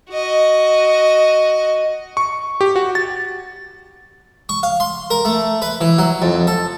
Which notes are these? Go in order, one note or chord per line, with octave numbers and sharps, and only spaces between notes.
F#4 D#5
C#6
G4
F#4
A6
C#6
F5
C6
A#4
A3
B4
E3
F#3
F2
A4